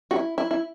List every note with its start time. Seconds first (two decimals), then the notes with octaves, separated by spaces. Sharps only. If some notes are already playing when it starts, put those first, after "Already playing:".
0.11 F#4
0.16 E4
0.38 E4
0.51 E4